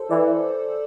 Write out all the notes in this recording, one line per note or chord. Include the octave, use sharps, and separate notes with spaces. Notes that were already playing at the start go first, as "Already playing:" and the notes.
Already playing: A4 C5
E3 D5